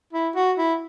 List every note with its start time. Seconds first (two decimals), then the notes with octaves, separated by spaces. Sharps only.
0.13 E4
0.36 F#4
0.58 E4